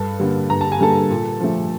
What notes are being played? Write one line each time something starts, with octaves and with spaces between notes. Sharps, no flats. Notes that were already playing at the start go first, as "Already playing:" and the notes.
Already playing: G2 A4 A5
D3 G3 A#3
G2 A#5
A5
G#5
D3 G3 A#3 A4 A5
A#2
F3 A3